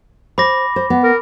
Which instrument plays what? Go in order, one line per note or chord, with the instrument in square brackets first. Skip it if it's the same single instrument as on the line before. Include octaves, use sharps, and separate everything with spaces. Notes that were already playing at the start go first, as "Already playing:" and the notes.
[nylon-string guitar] C5 [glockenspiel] B5 D6 A#6
[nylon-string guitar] C5
B3
[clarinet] A#4